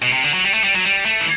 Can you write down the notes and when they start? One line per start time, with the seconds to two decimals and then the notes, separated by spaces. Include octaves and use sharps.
0.02 B2
0.12 C3
0.24 D3
0.34 F#3
0.44 G3
0.54 A3
0.64 G3
0.74 F#3
0.85 G3
1.05 A3
1.20 E3